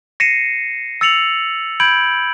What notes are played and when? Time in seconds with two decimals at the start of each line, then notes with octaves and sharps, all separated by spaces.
0.20 A#6 C7 C#7 D#7 E7
1.01 E6 A6 C#7 F7 F#7
1.80 B5 G6 G#6 D7 F#7